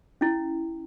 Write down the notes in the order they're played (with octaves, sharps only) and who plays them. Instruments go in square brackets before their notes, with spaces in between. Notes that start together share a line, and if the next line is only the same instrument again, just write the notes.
[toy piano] C#4 E4